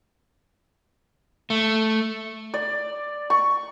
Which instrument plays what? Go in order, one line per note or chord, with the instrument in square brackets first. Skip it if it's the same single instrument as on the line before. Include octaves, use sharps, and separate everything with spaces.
[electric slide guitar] A3
[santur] D5
C#6